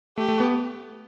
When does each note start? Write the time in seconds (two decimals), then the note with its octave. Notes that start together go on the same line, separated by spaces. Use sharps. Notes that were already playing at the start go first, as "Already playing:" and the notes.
0.18 A3 G4
0.28 A3
0.40 B3